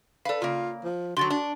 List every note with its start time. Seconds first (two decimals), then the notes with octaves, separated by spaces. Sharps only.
0.25 A4 B4 D5 F5
0.42 C#3 A#3 F4
0.84 F3
1.17 D3 F#3 F#4 C6 A6
1.30 D4